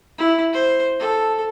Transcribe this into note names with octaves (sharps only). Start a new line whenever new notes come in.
E4
C5
A4